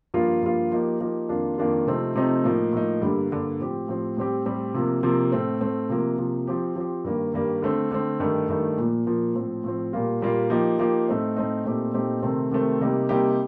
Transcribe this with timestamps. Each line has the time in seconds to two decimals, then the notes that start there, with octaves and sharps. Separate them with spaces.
0.14 G2 F3 A#3 F4
0.42 G2 F3 A#3 F4
0.72 F3 A#3 D#4 G4
1.00 F3 A#3 D#4 G4
1.29 F2 D#3 A#3 D4 F4
1.58 F2 D#3 A#3 D4 F4
1.87 C3 F3 A3 C4 D#4
2.15 C3 F3 A3 C4 D#4
2.44 A2 F3 A#3 D#4
2.73 A2 F3 A#3 D#4
3.02 G2 D3 G3 A#3
3.30 G2 D3 G3 A#3
3.59 A2 F3 C4 G4
3.88 A2 F3 C4 G4
4.17 A2 G3 C4 G4
4.45 A2 G3 C4 G4
4.74 C3 F3 A#3
5.03 C3 F3 A#3
5.32 A2 A3 C4
5.61 A2 A3 C4
5.89 C3 F3 A#3
6.18 C3 F3 A#3
6.47 F3 C4 G4
6.76 F3 C4 G4
7.04 G2 D#3 G3 A#3
7.34 G2 D#3 G3 A#3
7.62 D3 A3 C4
7.91 D3 A3 C4
8.20 G2 D#3 A3 D#4
8.49 G2 D#3 A3 D#4
8.78 A#2 F3 A#3
9.06 A#2 F3 A#3
9.35 A2 F3 C4
9.64 A2 F3 C4
9.93 A#2 G3 A#3 F4
10.21 A#2 G3 A#3 F4
10.50 F3 A#3 D#4 G4
10.79 F3 A#3 D#4 G4
11.08 A2 A3 C4 D#4
11.37 A2 A3 C4 D#4
11.65 A#2 A3 C4 D#4 G4
11.94 A#2 A3 C4 D#4 G4
12.23 C3 D#3 A3 C4
12.51 C3 D#3 A3 C4
12.80 C3 G3 A#3 D#4 G4
13.09 C3 G3 A#3 D#4 G4